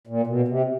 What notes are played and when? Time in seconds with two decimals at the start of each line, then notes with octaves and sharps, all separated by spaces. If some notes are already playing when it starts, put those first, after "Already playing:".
0.07 A#2
0.27 B2
0.48 C3